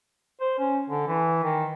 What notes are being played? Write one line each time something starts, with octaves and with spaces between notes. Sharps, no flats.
C5
C#4
D3
E3
D#3